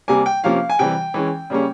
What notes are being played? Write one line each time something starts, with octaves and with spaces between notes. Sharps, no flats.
C3 G3 A#3 G#5
G5
C3 F3 A#3 C#4 F5
G#5
C3 E3 G3 G5
E3 G#3 C#4
C#3 G3 A#3 C#4